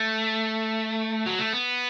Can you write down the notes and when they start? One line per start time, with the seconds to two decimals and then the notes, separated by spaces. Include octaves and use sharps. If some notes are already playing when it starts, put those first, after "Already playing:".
Already playing: A3
1.26 F#3
1.39 A3
1.53 B3